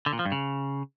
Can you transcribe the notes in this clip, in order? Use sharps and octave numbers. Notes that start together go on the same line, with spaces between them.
D3
A#2
F3
G2
C#3